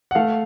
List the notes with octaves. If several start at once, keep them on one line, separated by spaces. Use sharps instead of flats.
F#5
A3 F5